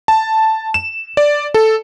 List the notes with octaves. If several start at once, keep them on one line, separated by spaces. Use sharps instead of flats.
A5
E7
D5
A4